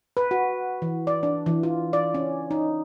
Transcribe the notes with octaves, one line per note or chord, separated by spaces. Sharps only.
B4
F#4
E3
D5
D4
E3
F4
D5
C#4
D#4